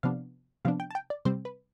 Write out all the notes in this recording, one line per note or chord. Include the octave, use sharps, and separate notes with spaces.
C3 F3 B3 D4 F5
C3 F3 B3 D4 F5
G5
A5
G5
D5
C3 G3 C4 C5
B4